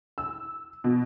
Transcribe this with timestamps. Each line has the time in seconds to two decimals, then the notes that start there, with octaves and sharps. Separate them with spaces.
0.18 E6
0.84 B2